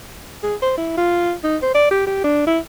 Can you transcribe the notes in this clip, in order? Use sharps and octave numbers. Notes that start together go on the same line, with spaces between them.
G#4
C5
E4
F4
D#4
C5
D5
G4
G4
D4
E4